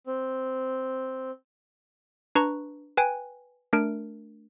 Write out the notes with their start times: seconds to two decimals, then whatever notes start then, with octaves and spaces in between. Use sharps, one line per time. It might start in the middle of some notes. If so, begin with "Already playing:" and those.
0.07 C4
2.35 D4 B4 A#5 C#6
2.97 B4 G5 G#5
3.73 A3 D4 A#4 F6 D7